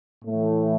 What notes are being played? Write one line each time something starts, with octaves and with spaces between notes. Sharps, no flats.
A2 E3 A3